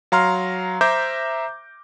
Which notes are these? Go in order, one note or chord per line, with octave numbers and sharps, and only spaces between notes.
F#3 F5 A#5 C6 F6
C5 E5 A#5 D6 G6 A#6